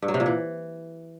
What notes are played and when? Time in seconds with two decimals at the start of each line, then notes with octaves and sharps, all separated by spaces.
0.02 G2
0.08 F#3
0.14 C3
0.20 A#2
0.26 E3